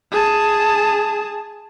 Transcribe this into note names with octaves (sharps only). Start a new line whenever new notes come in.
G#4 A5